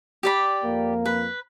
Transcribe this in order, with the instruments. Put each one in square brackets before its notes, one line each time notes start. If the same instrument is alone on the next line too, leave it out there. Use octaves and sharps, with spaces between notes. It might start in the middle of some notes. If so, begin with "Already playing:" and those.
[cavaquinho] G4 D5 B5
[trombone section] F2 A#3
[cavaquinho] B4